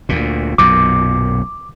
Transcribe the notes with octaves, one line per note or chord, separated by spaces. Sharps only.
D2 A#2
B1 F#2 A#2 D6